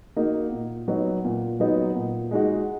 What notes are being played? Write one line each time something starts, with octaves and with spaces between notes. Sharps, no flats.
A#3 D#4 F#4
A#2
F#3 B3 D#4 F#4
A#2
F#3 B3 D#4 F#4
A#2
G#3 D#4 F#4